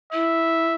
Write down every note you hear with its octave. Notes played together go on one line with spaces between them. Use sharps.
E4 E5